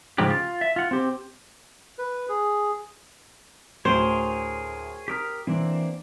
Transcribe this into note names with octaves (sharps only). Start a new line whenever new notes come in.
G#2 C#3 F3 F#3 G4
F4
E5
F4 F#5
C4 G4
B4
G#4
D2 A2 G#4 A#4 C5 C#5
G4 A#4 A#5 D#6 F6 B6
E3 A#3 C4 D4